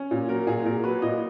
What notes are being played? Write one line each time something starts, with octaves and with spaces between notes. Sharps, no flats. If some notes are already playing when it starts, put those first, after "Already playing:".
Already playing: C#4
A#2
F#3 A#4
A#2 G#4
A#2 A#4
F#3 B4
A#2 D#5